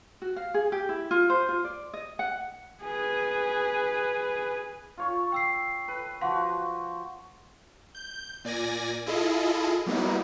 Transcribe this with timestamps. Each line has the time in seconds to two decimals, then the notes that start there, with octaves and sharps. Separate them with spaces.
0.22 F#4
0.36 F5
0.54 G#4
0.72 G4
0.89 E4
1.11 F4
1.30 C5
1.49 F4
1.65 D5
1.93 D#5
2.19 F#5
2.83 G#4 B4
4.98 F4 C#5 C#6
5.32 G5 E6 C7
5.88 B4
6.21 F3 F#4 F5 F#5 C6
7.95 G6
8.45 A#2 D5 G#5 A#6
9.06 E4 F4 G#4 A4 D#5
9.86 F#3 G3 A#3 B3 D#4 E4